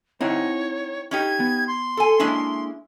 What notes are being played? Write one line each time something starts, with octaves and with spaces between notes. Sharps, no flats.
C4 D#4 E4 C#5 F#5
C#4 D#4 G4 G#6
B3
C6
A4 G#5
G#3 A#3 C#4 D4 E4